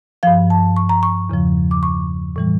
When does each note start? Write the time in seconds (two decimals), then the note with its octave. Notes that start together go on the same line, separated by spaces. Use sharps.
0.23 G2 F3 F5
0.50 A5
0.77 C#6
0.89 A#5
1.03 C#6
1.29 E2 C#3 F3
1.71 D6
1.83 C#6
2.36 A2 E3 G3